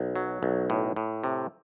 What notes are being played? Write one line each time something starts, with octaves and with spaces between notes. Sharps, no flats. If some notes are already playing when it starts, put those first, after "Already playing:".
Already playing: B1
F#3
B1
A2
A2
C3